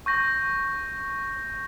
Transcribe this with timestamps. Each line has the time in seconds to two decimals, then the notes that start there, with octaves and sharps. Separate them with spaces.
0.06 C#6 G6 A#6